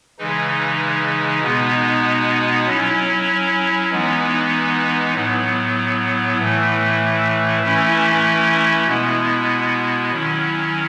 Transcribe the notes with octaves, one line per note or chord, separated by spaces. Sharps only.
C#3 E3 G#3 D#4
B2 G#3 B3 D#4
F#3 C#4 E4
E3 G#3 B3 D#4
A2 F#3 B3
A2 E3 A3
E3 A3 C#4 E4
B2 G#3 B3 E4
D#3 F#3 C#4 E4